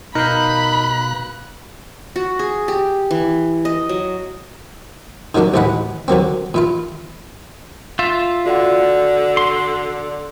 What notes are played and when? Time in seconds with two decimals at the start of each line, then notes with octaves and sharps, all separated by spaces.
0.15 B2 D#4 A#4 F5 B5 F#6 G6
2.16 F#4
2.39 G#4
2.68 G4
3.11 E3
3.65 D#5
3.89 F#3
5.35 D3 D#3 F#3 A#3 D4
5.54 A1 D2 E3 G#3 F#5 B5
6.08 D3 F#3 A#3 C4
6.54 A#2 E4 F4
7.99 F4 E5
8.46 D3 F#4 D5 F#5
9.37 C6